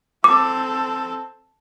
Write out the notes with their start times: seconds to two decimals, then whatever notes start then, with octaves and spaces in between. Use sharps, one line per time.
0.24 C4 A4 D6